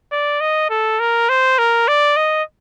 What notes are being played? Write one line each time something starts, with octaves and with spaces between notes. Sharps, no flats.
D5
D#5
A4
A#4
C5
A#4
D5
D#5